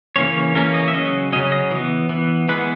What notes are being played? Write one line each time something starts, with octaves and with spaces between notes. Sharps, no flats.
C#3 E3 A#3 C#4 C#5
C#5
C#3 E3 A#3 C#4 A#4
D#5
E5
C#3 F#3 C#4 D#5
C#3 F#3 C#4 D#5
D#5
E3 B3
E3 B3
E3 G#3 B3 B4